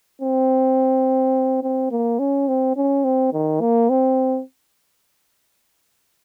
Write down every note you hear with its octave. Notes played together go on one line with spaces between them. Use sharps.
C4
C4
A#3
C#4
C4
C#4
C4
D#3
A#3
C4